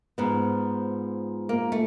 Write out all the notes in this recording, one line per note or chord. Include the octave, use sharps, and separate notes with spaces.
G#2 F3 B3
A#3
A3